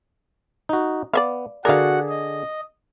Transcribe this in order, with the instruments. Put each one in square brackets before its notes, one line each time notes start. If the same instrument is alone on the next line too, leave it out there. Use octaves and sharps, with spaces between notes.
[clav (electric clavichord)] D#4 F#4
[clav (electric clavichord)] B3 [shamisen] D5 E5 F5
[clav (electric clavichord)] D3 G#4 D5 [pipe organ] F#4 F#5 [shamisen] A#4 F5
[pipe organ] D#5